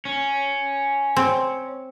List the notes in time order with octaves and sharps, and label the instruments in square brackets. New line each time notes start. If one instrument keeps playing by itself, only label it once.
[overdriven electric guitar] C#4
[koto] C4